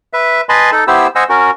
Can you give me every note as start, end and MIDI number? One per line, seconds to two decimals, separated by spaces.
0.13 0.41 71
0.13 0.41 76
0.49 0.70 71
0.49 0.70 75
0.49 0.70 80
0.49 0.70 81
0.49 0.70 83
0.49 0.70 84
0.72 0.84 63
0.72 0.84 69
0.87 1.07 59
0.87 1.07 64
0.87 1.07 67
0.87 1.07 72
0.87 1.07 88
1.15 1.24 72
1.15 1.24 75
1.15 1.24 78
1.15 1.24 80
1.15 1.24 88
1.29 1.51 61
1.29 1.51 66
1.29 1.51 70